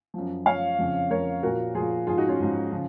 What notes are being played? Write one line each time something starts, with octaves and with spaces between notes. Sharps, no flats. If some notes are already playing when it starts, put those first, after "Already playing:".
F#2 F3
F#2 F3 C#5 F5
F2 C#3 F3
F2 C#3 F3 A#4 C#5
A#2 F3 F#4 A#4
F3 F4 G#4
A#2
G#2 F3 F4 G#4
D#4 F#4
C#4 F4
G#2 F3
C#3 F3